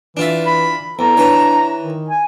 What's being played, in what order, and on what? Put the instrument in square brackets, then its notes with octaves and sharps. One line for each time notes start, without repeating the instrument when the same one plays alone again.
[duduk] E3 [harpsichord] D4 F4 E5
[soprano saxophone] B5
[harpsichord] E2 [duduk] A4 [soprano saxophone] A#5
[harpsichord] E3 C#5 [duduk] D4
[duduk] D#3
[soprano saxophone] G#5